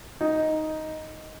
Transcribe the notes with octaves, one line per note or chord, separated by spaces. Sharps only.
D#4